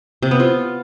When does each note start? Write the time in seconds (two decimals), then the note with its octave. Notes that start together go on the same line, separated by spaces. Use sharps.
0.22 C3
0.31 B3
0.40 F4